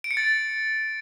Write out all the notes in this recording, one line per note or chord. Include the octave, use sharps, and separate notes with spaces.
D7
C#7
A6